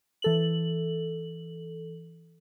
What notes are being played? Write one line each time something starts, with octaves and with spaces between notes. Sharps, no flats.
E3 A4 F#7